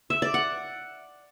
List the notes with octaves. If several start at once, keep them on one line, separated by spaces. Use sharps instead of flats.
E5
D5
F#5